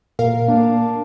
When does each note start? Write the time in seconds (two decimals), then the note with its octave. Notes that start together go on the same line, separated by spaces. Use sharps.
0.19 A#2 A#4 F5
0.49 A#3 D4